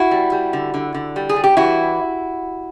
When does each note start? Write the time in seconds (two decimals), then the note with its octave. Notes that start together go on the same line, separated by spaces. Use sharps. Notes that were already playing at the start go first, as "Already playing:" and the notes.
Already playing: E4 F#4
0.11 G3
0.32 G3
0.53 D3
0.74 D3
0.94 D3
1.16 G3
1.29 G#4
1.36 G3
1.44 G4
1.57 E3 E4 F#4